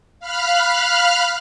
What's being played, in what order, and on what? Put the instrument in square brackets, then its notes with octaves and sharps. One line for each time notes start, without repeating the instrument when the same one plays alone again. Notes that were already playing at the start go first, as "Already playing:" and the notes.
[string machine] F5 B5 F6 F#6